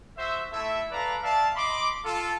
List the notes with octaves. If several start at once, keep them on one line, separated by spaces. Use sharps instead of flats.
F#4 C5 E5
A3 E4 A4 E5
A4 B4 D5 F5 A#5
D5 E5 F5 A5
D#5 B5 C6 D6
F4 A4